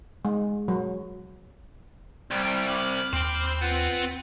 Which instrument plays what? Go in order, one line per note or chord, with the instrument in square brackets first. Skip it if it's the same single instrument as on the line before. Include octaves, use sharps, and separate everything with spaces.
[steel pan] G#3
F#3
[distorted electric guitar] C2 [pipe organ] G3 G5
[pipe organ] B5 D6 F6
[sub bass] D#2 [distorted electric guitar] C4 G5
[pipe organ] F4 B4 F#5